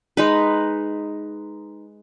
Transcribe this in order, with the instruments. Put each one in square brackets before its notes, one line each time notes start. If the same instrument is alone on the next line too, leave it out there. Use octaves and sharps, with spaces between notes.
[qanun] G#3 D#4 B4